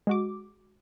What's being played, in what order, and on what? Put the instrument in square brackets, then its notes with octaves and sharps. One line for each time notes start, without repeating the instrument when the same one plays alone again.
[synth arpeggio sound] G#3 F#4 D6